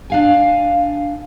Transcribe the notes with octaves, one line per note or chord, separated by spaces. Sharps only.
D4 F5 G#5